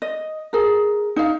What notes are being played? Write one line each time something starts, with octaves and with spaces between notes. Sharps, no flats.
D#5
G#4 A#4
D#4 F5